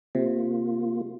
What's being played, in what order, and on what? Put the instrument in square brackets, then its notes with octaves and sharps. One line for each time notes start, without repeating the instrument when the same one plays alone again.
[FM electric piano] C3 [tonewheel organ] A#3 F4